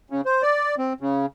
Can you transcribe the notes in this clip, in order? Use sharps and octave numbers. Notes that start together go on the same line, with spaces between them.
C#3
C5
D5
C4
C#3